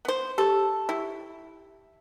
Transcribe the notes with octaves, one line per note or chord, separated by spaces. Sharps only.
B3 C5
G4 A4 C#6
E4 G5 C#6